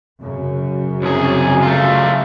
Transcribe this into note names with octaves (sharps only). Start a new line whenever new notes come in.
F#2 C#3
C2 G#4
A3 F4